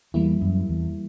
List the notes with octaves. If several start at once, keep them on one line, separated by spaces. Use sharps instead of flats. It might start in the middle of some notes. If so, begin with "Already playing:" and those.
E2 E3 G3 A#3 E4
F#2
E2